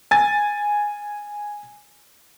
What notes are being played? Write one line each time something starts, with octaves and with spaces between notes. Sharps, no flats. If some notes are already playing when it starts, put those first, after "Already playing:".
G#5 A6